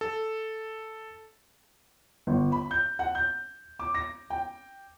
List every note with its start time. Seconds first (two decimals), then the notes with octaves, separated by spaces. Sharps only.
0.01 A4
2.27 G1
2.52 B5
2.71 G6
2.99 F#5
3.15 G6
3.79 D6
3.95 A#6
4.30 G5